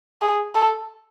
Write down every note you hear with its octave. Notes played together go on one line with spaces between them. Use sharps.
G#4
A4